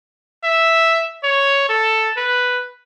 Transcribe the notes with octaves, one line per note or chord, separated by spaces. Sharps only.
E5
C#5
A4
B4